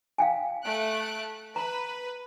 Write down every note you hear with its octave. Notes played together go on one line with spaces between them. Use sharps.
F5 G5 G#5
A3 F#6 D7
B4 A#5